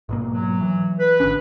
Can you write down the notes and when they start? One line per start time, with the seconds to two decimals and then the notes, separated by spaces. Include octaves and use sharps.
0.09 G#2 B2 A#3
0.33 F#3
0.61 E3
0.99 B4
1.20 G#1 D3 C#4